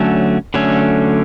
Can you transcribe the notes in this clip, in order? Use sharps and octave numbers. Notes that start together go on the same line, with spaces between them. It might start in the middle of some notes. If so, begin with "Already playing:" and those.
Already playing: D3 F#3 A3 C#4
D3 F#3 A3 C#4